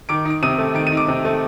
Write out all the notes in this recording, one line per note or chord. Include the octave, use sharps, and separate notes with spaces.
D#3 D6 D7
D#4
D7
C3 D#6 D#7
A3
D#3 D7
D#7
D#4
D6 D7
C3
A3